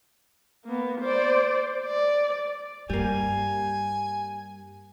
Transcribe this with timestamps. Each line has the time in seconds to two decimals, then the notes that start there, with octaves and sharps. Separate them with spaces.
0.65 A#3 B3
1.01 C5 D5
1.86 D5
2.90 G2 G3 A#3 G#5